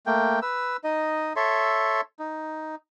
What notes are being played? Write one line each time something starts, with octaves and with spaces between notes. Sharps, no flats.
A3 A#3 G5
B4 E6
D#4 D#5
A4 C#5 E5 C6
D#4